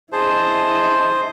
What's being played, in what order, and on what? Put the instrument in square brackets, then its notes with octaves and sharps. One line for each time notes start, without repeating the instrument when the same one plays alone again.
[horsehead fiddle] E4 D#5 [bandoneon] G#4 A5 [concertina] C5